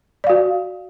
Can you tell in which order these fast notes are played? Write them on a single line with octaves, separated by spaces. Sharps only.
D5 F5 F#4